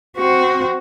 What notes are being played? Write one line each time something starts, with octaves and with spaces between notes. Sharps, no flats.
C4 F#4